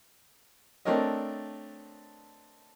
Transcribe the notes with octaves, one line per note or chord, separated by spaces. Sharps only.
A3 C4 D4 A#4 C#5 D#5